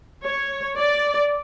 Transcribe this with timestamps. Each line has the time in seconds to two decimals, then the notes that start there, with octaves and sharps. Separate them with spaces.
0.23 C#5
0.77 D5